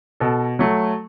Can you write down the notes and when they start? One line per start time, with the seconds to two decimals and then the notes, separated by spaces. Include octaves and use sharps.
0.20 B2 A4
0.59 F#3 A3